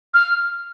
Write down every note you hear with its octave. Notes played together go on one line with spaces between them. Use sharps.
F6